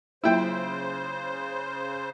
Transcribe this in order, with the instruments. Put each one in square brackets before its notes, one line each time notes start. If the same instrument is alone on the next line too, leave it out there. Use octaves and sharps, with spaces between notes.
[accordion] C#3 C5 [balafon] F#3 A#3 F4 [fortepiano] E4 G5